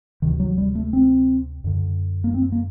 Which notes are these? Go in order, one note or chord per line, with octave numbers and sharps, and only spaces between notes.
D2 C3 D#3
F#3
G3
A3
C4
F#2 D3
A#3
C4
A#3